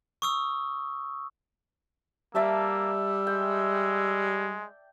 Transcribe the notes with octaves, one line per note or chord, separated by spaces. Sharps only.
C#6 D#6 E6
G3 A#3 D5 E5 A5 E6
G#3 G5